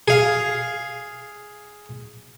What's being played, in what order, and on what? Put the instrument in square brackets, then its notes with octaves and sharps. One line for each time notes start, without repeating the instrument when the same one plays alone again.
[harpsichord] G#4 F5